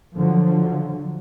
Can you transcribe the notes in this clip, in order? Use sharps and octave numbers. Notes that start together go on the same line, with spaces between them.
D3 F3 F#3